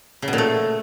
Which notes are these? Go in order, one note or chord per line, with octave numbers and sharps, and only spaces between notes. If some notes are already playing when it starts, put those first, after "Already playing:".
C#3
B2
A#2
A3